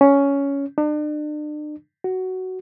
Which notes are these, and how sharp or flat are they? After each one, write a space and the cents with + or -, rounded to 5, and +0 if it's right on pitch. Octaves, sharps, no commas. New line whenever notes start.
C#4 +10
D4 +40
F#4 +10